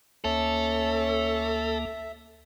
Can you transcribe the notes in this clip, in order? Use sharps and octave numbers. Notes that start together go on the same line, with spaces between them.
D2 A#3 C#4 A4 E5